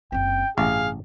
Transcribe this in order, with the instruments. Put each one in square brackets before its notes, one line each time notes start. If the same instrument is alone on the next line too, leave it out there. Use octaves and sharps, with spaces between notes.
[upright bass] F#1 C4 [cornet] G5
[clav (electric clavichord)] A1 [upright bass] G2 C3 [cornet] G#4 [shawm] F5